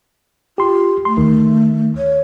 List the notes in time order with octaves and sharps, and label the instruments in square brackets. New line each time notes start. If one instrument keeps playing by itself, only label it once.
[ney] F4 [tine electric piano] G4 C6
[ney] A3 [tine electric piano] C6
[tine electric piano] D2 D#3
[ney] C#5